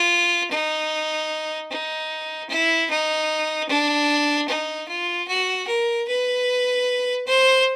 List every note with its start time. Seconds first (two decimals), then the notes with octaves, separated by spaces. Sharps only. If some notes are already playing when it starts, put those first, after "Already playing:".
Already playing: F4
0.51 D#4
1.71 D#4
2.49 E4
2.90 D#4
3.68 D4
4.48 D#4
4.88 F4
5.28 F#4
5.67 A#4
6.07 B4
7.26 C5